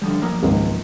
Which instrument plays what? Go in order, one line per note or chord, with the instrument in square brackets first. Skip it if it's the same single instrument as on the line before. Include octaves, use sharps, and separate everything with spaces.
[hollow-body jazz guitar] D3 F3 G3
F3 F#3 A#3
[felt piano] G#1 C#2 A#4